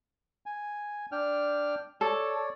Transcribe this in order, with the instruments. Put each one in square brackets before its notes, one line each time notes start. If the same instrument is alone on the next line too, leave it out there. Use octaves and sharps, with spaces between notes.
[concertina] G#5
D4 G5 F6
[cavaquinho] A4 [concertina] C#5 D5